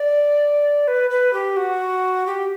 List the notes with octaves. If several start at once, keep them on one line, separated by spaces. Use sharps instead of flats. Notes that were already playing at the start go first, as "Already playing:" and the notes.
Already playing: D5
B4
B4
G4
F#4
G4